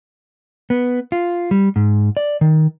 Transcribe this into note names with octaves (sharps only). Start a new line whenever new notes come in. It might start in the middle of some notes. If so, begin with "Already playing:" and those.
B3
F4
G3
G#2
D5
D#3